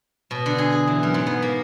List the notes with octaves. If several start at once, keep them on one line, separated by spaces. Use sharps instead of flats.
B2
D3
G#4
G#4
E3
F#2
G#2
B3
A#3